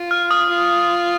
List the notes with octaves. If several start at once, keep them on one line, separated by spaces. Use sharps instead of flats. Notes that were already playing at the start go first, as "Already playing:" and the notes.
Already playing: F4
F6
D#6
F4